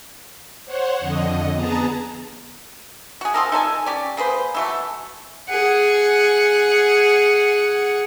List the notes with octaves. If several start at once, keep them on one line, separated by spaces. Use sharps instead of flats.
C5 C#5 F#5
F2 D3 D#5
B3 G#4 A5 A#5
F#4 G#4
C4 F4 A4 A#4
D#4 A4 D5 G#5
C#4 G4 D5
A#3 G#4 B4 C5
E3 F#3 A3
G#4 F#5